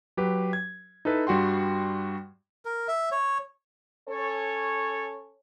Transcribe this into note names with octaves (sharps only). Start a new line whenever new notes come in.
F#3 G4 B4
G#6
D#4 E4 A4 B4
G2 G3 F#4 G5 C6
A#4
E5
C#5
C#4 A4 C#5